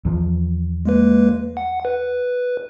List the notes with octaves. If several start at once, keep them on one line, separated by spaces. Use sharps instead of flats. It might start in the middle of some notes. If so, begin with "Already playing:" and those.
E2 F3
G#3 A#3 B4
F#5
B4